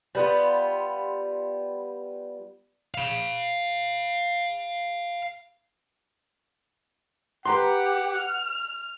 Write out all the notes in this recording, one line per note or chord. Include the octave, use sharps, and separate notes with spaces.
G3 B3 F4
F5 B5
G4 B4 F#5 A#5 C6
F6